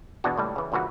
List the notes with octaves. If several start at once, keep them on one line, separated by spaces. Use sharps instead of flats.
E2 B2 D4 F#4
C#2 A2 G3
C#3 E3
G2 A#2 C#3 E3 F#4 B4